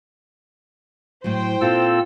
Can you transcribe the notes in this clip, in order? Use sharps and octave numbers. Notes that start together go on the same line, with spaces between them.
A2 F#3 C5 G5
A#2 C4 F4 A4 E6